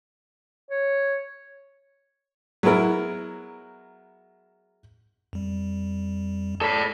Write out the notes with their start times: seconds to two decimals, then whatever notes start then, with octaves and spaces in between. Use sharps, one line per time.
0.70 C#5
2.63 F#3 G#3 B3 E4 A#4
5.33 F2 G3
6.61 A4 D5 B5